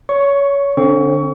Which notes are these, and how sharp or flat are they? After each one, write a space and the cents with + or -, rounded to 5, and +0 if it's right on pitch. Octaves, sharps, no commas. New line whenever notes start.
C#5 +20 C#6 +0
D3 +0 C4 +35 C#6 +30